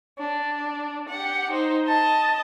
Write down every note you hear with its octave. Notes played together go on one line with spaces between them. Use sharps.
D4
G4 F#5
D#4 C5
D#5 A5